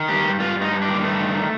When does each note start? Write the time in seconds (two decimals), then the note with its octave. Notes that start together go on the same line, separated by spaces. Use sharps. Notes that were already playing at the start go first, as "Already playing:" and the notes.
Already playing: D#3
0.08 G2 G4
0.25 G2
0.40 G2 F4
0.55 G2
0.61 D#4
0.72 G2
0.82 D4
0.88 D#3
0.93 A#3
1.03 G2 A3
1.20 D#3
1.35 D#3